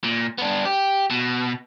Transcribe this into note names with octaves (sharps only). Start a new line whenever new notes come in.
A#2
B3 D4
G4
B2